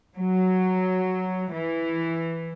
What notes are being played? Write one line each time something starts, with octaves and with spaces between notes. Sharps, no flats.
F#3
E3